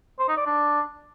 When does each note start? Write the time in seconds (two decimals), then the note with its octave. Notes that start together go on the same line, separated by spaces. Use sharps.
0.19 C5
0.28 D#4
0.37 D5
0.46 D4